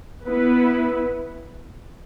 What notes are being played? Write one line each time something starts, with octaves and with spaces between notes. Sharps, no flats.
B3 E4 B4